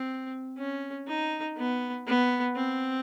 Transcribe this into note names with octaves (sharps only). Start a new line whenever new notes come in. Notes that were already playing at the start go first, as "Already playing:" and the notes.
Already playing: C4
C#4
D#4
B3
B3
C4